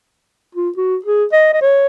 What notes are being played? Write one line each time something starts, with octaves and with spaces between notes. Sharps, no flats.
F4
F#4
G#4
D#5
D#5
C#5